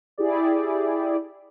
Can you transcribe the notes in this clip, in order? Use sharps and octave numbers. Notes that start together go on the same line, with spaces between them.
E4 G4 G#4 D5